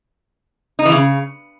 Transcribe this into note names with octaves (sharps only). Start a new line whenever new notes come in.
D#4
E3
C#3